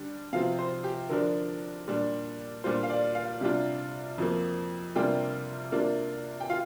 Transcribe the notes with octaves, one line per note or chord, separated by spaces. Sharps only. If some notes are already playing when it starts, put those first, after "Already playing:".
Already playing: D3 G3 D4
C3 F3 C4 F4 F5
C5
G4
D3 F3 D4 A#4
A#2 G3 D4
A#2 G3 D4 F4 C5
F5
D5
F5
C3 G3 D4 F4
F2 F3 A#3
C3 G3 A#3 D4 F4 G5
C3 A#3 D4 F4
G5
F4 F5